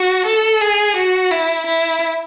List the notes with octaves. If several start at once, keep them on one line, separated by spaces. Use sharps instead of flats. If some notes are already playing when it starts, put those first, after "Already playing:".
Already playing: F#4
A4
G#4
F#4
E4
E4